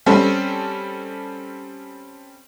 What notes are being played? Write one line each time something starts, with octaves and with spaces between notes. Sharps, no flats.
G3 C4 C#4 A4